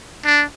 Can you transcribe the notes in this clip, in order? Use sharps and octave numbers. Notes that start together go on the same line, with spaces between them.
D4